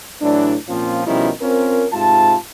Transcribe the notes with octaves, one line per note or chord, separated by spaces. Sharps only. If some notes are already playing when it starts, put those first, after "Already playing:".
A2 E3 F#3 D4
A#2 F3 C4 C#4 F4
B2 D#3 F3 G3 C#4 E4
C4 C#4 F4 A#4
G#2 C3 F4 A5